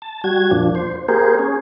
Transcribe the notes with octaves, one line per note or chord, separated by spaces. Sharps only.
A5
G3 F#4 G#6
F2 A#2 F3 D4
C5
A#3 G4 G#4 A#4 C5
C#4 G#4